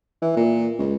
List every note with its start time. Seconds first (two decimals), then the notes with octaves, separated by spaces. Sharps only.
0.22 E3
0.37 A#2
0.79 C#2